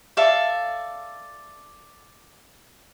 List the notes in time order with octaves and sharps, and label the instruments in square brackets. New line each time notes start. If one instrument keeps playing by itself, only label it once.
[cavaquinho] A4 D5 E5 F5